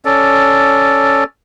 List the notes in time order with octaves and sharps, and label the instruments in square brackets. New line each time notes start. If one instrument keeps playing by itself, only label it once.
[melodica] C#4 A4 D5